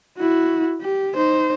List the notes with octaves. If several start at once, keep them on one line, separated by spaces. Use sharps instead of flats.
E4 F#4
G4
D#4 C5